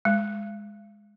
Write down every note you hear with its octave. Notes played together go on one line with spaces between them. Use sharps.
G#3